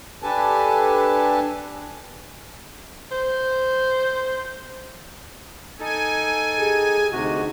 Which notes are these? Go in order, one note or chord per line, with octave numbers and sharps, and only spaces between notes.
D4 G4 A4 B4 G#5 A5
C5
D#4 A4 G#5
G4 G#4
D2 C3 D#4 F#4 G#4